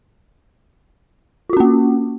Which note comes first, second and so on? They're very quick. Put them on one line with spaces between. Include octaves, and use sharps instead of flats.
F4 F#4 C#4 A#3